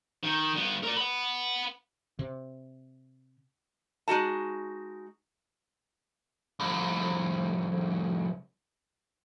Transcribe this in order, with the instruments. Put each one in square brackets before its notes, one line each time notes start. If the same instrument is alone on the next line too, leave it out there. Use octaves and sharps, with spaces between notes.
[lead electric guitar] D#3
G2 B3
A#4 D5
F#5 B5
[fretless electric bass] C3
[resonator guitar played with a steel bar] G#3 D#4 F#4 A5
[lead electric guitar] C2 F2